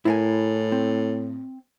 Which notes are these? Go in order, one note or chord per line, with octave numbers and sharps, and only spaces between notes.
A2 E4 A#4 G#5
C4